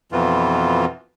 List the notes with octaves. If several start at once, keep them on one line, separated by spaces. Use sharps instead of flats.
F2 B2 E3 F4